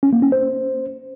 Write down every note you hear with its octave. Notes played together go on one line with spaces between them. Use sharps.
C#4
A#3
C#4
C5